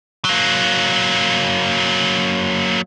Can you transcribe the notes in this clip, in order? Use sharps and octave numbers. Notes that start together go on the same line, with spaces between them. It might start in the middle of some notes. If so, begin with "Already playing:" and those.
F#3 A#3